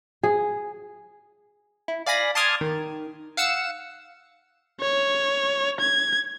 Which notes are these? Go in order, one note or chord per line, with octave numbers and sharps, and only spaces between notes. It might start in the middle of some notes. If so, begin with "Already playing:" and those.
G#4
E4
D5 F5 G#5 B5 A#6
A5 C6 D6 D#6 F6 G#6
D#3
F5 F#5 E6 C#7 E7
C#5
G#6